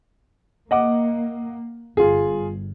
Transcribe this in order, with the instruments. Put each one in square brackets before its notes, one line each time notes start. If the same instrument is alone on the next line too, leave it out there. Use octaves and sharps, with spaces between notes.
[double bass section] A#3 [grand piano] D#5 F#5 D6
[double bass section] G1 [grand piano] F4 G#4